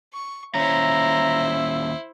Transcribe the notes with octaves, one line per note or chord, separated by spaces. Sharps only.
C#6
D#2 C#4 E4 C5 E5 A#5